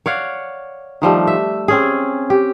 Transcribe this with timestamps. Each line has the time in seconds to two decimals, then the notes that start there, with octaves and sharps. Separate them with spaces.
0.06 C#5 D5 F5 F#5
1.02 D#3 F3 G3 A3
1.27 E5
1.68 C4 C#4 G#4
2.30 G4